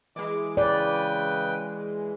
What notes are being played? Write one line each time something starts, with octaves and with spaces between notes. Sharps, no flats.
E3 G#3 D6
C#3 B4 D5 G5